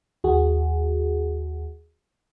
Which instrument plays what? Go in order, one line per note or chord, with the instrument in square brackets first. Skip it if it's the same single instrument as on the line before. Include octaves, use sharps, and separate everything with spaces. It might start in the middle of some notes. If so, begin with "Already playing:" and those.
[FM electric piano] D#2 F#4 G#4